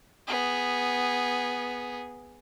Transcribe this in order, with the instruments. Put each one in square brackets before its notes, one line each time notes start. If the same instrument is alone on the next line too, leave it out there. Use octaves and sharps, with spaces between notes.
[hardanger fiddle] B3 G#4